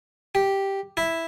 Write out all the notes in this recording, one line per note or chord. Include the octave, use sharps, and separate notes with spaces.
G4
E4